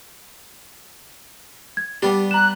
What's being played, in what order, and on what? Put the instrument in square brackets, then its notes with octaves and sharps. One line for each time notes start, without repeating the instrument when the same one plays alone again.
[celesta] G#6
[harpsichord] G3 B3 D4 [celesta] G4
[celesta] A#5 E7 [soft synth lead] F#6